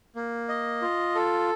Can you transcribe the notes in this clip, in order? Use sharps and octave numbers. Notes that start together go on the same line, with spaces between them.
A#3
D#5
F4
A4